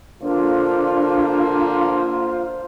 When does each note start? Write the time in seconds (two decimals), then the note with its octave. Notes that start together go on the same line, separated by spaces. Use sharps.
0.22 D3 A#3 D4 F4 C5